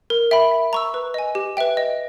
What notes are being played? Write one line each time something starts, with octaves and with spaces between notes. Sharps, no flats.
A#4
E5 G5 B5
E5
A#5 C#6 E6
B4
D#5 G#5
G4
B4 E5 G5
D#5